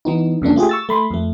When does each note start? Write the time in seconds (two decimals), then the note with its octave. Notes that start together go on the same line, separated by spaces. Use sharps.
0.05 E3 B3 D#4
0.42 F2 C#3 A#3 D4
0.56 A3 F4 G4 G#4
0.69 C#6 E6 A6
0.89 A3 B5 C6
1.11 F2 A3